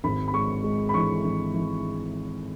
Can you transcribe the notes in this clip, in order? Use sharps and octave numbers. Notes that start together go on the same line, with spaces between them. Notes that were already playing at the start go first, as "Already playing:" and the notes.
G#1 B5
B5
G#3 C#6
G#3
B5
E3 C#6
G#1
E3